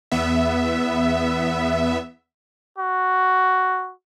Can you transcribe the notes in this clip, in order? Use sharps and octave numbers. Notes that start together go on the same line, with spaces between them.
E2 B3 E5
F#4